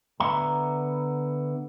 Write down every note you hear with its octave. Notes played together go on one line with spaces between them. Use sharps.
D3 B3 E5 F#5 A#5 B5